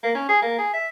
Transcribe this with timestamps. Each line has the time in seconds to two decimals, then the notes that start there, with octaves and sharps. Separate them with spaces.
0.03 A#3
0.15 C#4
0.29 G#4
0.42 A#3
0.59 G#4
0.74 E5